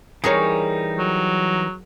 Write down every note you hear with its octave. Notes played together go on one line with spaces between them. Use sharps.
E3 G3 D#4 G#4 A#4 C#5
F#3